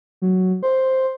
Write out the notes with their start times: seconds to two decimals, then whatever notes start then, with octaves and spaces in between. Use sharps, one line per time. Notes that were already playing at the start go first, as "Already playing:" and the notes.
0.22 F#3
0.63 C5